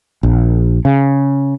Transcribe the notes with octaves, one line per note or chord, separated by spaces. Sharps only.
A#1
C#3